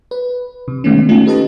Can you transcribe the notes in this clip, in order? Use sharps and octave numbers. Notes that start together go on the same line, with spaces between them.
B4
C3
D#3 G#3 A3 B3 C#4
A3 C#4 D#4 F4
G4 A4 B4 D#5 A5